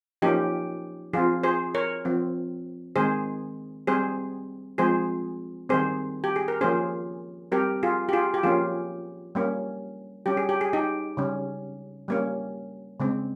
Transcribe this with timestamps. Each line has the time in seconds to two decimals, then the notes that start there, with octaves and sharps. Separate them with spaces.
0.22 F3 A#3 C#4 D#4 G4
1.13 F3 C4 F4 G#4
1.43 G#4 C5
1.75 A#4 C#5
2.05 F3 C4
2.96 D#3 G#3 C4 G#4 C5
3.87 G3 C4 G#4 C5
4.78 F3 G#3 C4 G#4 C5
5.69 D#3 G3 C4 G#4 C5
6.24 G4
6.36 G#4
6.48 A#4
6.61 F3 A#3 C#4 G#4 C5
7.52 G3 C4 G4 A#4
7.83 F4 G#4
8.09 G4
8.13 F4 G#4
8.34 G4
8.43 F3 A#3 C#4 F4 G#4
9.35 G3 A#3 C#4
10.26 G3 C#4 G4
10.37 G#4
10.49 G4
10.61 G#4
10.73 D#4 G4
11.17 C#3 G3 C#4
12.08 G3 A#3 C#4
13.00 C#3 G#3 C4